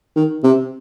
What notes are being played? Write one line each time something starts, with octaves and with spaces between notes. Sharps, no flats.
D#3
C3